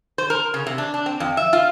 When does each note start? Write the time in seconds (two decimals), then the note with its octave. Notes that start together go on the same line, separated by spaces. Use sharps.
0.18 C5
0.30 A#4
0.54 C#3
0.67 C3
0.78 D4
0.94 D4
1.06 C4
1.20 F2
1.37 E5
1.53 F4